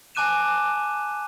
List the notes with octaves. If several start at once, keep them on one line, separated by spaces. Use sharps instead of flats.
G#5 A5 D6 F#6 D#7 E7